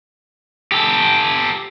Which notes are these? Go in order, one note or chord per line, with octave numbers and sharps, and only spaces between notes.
G4 A4